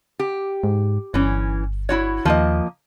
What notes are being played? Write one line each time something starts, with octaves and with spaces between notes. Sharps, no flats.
G4
G#2
G1 E3 C#4
E4 F#4 C#5
D#2 F3 A#3 D#5